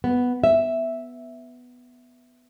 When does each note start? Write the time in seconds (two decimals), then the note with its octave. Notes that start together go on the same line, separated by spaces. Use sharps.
0.04 B3
0.44 E5